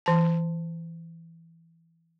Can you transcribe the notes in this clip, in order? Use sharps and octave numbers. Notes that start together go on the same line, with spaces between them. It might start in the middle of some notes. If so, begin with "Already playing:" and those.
E3 A5